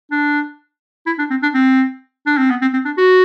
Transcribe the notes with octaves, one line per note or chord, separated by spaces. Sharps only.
D4
E4
D4
C4
D4
C4
D4
C4
B3
C4
C4
D4
F#4